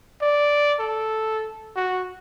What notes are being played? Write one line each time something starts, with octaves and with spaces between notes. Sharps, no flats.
D5
A4
F#4